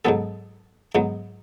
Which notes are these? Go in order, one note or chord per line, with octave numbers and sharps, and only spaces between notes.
G#2 F#3 B3 A4
G#2 F#3 B3